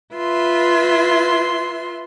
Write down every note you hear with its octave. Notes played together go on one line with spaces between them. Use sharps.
F4 B4 E5 C6